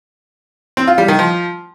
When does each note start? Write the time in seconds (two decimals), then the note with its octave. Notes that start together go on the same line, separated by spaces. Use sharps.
0.77 C4
0.87 F4
0.98 G3
1.08 D#3
1.19 F3